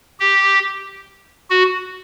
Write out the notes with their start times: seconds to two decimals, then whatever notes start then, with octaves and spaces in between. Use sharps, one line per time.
0.20 G4
1.50 F#4